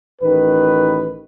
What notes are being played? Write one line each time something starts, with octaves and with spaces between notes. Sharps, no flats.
A1 D#3 B4